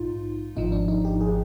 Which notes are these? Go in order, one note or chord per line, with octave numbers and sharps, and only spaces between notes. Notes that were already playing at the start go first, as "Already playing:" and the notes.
Already playing: A#1 G#2 D#4 F4
G#1 G#2 F3 D#4
D4
D#4
G4
G#4